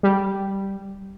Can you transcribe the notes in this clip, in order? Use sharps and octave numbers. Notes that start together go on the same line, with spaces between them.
G3